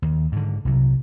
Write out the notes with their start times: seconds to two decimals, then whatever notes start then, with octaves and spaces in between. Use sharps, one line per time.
0.02 D#2
0.32 G#2 D3
0.65 C2 C3 F#3